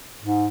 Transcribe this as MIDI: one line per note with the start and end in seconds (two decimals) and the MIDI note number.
0.22 0.48 44